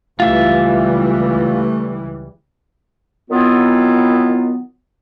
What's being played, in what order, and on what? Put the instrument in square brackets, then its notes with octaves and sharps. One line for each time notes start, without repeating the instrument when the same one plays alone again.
[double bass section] C#2 E3 G3 [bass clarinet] A3 [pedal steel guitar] F4 E5
[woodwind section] D#3 F#3 B3 C4 E4 F4